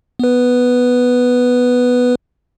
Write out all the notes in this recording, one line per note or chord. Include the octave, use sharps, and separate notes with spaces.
B3 B4